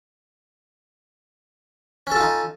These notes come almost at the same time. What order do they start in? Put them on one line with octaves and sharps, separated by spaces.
C#4 A4 F4 D#4